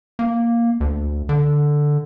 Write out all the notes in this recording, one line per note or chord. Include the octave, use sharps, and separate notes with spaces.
A#3
D2
D3